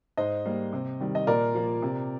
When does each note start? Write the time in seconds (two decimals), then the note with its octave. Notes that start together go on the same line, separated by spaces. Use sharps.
0.17 G#2 C5 D#5
0.45 G3 A#3
0.73 C3
1.00 D#3 G3
1.15 D#5
1.27 A#2 A#4 D5
1.54 F3 A#3 F4
1.82 C3